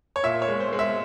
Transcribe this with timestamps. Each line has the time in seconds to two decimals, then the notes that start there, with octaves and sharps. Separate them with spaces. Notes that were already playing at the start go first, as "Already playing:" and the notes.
0.16 C#5
0.23 A#2 E5
0.42 C#5
0.48 G#3
0.60 C5
0.73 G#3
0.79 E5